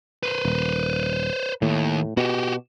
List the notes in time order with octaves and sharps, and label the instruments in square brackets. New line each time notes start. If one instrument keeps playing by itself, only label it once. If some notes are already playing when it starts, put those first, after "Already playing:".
[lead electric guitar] B4 C5
[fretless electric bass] D#1
[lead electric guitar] D#2 [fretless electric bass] A2
[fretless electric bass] B2 [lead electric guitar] F#4 G4